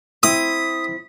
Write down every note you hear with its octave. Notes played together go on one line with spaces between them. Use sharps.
C4 E4 D#6 B6